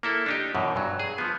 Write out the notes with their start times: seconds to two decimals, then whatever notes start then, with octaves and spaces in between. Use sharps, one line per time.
0.03 A#3 E4 A4
0.26 D4 D#4 G4
0.55 F#2 B2 E3
0.76 G2 F#3
0.99 G#4
1.18 F3 B3